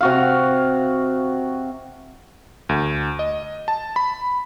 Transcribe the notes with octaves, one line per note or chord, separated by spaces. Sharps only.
C3 F#4 F5
D2
D#5
A5
B5